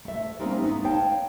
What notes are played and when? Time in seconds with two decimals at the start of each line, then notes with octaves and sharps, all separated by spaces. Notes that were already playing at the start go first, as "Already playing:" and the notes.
0.05 A3 E5
0.39 G3 A3 A#3 C4 C#4 D#4
0.62 A3 B3 D#4
0.84 C#5 F5 G5 A5